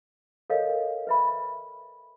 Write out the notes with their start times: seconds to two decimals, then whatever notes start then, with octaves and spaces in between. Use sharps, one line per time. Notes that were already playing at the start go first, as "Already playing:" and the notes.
0.50 A4 A#4 C#5 D#5 F5
1.07 B4 E5 B5